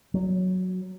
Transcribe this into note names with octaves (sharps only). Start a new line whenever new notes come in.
F#3